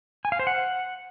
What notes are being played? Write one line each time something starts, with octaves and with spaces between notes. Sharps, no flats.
G#5
F5
C5
F#5